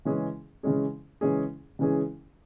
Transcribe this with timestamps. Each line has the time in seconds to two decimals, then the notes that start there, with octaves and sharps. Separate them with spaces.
0.05 C#3 E3 G#3 C#4 G#4
0.63 C#3 E3 G#3 C#4 G#4
1.21 C#3 E3 G#3 C#4 G#4
1.79 C#3 E3 G#3 C#4 G#4